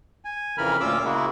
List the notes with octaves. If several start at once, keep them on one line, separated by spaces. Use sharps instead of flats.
G#5
F2 C#3 E3 A#4 B5 F6
D2 A#2 C#4 F4 D6 E6
C#3 G#3 A#3 E4 F#4